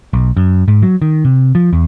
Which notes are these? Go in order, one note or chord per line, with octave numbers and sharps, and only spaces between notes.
B1
F#2
G#2
F#3
D#3
C3
F3
E2